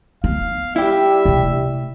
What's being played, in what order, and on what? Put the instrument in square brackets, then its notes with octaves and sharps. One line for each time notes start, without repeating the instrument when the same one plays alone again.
[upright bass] B3 [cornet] F5
[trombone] G3 [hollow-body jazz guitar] E4 G4 [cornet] E5
[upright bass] C3 A3